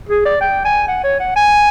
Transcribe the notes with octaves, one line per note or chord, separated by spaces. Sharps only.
G#4
D5
G5
G#5
F#5
C#5
F#5
G#5